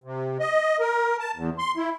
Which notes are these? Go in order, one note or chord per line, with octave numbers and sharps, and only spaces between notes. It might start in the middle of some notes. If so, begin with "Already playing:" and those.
C3
D#5
A#4
A5
E2
C6
E4